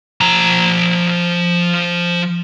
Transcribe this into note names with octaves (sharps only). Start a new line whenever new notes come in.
F3 A#5